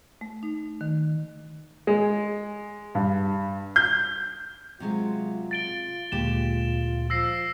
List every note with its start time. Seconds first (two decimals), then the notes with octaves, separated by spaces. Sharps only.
0.21 A3
0.43 D#4
0.81 D#3
1.87 G#3
2.95 G2
3.76 G6
4.80 C3 F#3 G#3 F4
5.51 A6 D7 G7
6.12 D2 A#2 G#3 G4 E7
7.10 F3 E6 A#6 C7